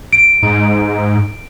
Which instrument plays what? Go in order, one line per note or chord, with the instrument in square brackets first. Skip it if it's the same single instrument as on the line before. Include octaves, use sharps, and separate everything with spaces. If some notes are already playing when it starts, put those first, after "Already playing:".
[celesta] D7
[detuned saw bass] G#2